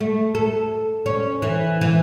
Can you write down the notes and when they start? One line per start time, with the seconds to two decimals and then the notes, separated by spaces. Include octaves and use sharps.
0.01 A3
0.35 A4
1.06 C#4
1.42 E3
1.81 E3